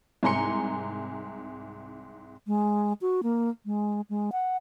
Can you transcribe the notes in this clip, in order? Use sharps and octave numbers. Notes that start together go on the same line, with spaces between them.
C2 G#2 G#5 A#5 C6 C#7
G#3
F#4
A#3
G#3
G#3
F#5